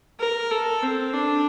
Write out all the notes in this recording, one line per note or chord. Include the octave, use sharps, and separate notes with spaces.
A#4
A4
C4
D4